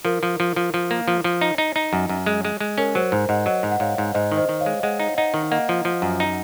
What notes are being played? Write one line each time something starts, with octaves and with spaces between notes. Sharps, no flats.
F3 A#4
F3
F3
F3
F3
A#3
F3
F3
D#4
D#4
D#4
F#2
F#2
G#3
G#3
G#3
C#4 A#4
F#3 C5
G#2 C5
G#2 D#5 F#5
F#3 D#5 F#5
G#2
F#5
G#2 C#5 F5
G#2
G#2 C5 D#5
D#3
C5 D#5
D#3
C#5 F5
G#3
G#3 D#5 F#5
D#4
D#4 D#5 F#5
D#3
A#3 D#5 F#5
F3
F3
F#2
D#4